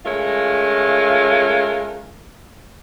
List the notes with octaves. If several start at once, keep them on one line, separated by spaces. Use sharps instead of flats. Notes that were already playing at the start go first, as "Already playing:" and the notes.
G#3 A3 C#4 F4 A#4